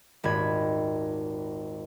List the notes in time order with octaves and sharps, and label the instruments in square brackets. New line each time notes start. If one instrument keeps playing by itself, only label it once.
[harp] D#1 G#1 B5 G#6